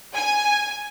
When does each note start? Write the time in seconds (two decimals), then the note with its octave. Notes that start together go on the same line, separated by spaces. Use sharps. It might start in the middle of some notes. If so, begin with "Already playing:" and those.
0.14 G#5